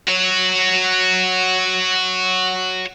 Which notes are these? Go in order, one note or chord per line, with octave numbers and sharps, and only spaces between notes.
F#4 C#5